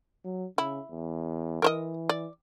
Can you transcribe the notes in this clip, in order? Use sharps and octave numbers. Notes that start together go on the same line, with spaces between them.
F#3
C#3 E4
E2
E3 A#4 C5 D#5
D5